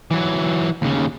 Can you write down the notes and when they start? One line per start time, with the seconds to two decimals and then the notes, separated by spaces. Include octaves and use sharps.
0.11 E3 F#3
0.82 D#2 C#3